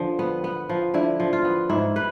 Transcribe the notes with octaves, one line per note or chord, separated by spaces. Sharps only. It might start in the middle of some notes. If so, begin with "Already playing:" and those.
Already playing: D3 F3
B3
B3
F3
D3 E4
F3
F4
B3
G#2 E4
B4